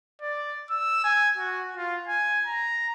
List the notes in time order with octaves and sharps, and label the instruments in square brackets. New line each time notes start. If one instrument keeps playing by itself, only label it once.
[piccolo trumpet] D5
E6
G#5
F#4
F4
G#5
A#5